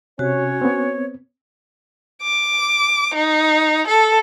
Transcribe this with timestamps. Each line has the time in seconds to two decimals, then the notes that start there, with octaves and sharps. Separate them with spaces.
0.19 C3 C#4 F#4 C#5
0.62 B3 C4
2.23 D6
3.15 D#4
3.87 A4